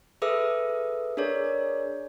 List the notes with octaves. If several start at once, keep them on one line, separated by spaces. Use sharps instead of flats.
G#4 A4 B4 E5 D#6 E6
D4 G#4 A#4 C#5 D5